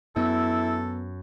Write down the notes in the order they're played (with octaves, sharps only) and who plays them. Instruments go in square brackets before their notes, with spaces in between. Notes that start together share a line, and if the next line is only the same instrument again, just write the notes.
[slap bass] F#2 [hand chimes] B3 [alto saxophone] E4 [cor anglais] A4